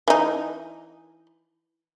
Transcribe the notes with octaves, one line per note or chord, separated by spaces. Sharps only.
E3 D#4